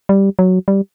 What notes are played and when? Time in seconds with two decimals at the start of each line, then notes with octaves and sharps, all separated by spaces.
0.09 G3
0.39 F#3
0.68 G3